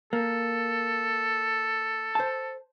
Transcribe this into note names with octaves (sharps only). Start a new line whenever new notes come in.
A#3 A4
C5 A5